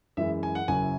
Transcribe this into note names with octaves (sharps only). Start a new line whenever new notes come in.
F#2 E3 G#3 E4 E5
G#5
F#5
F#1 F#2 F#3 E4 G#5